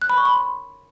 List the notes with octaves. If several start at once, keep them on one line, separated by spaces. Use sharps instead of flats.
F#6
B5
C#6
B5
C6